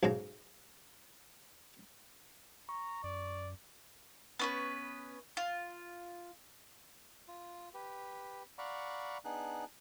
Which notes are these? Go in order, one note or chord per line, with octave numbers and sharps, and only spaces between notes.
B1 G#2 C#3 F5 A#5
A#5 C#6
F#2 D5
B3 C#4 B4
F4
F4
G4 B4
D5 F5 F#5 A#5 B5 C#6
B3 D4 D#4 G#4 F#6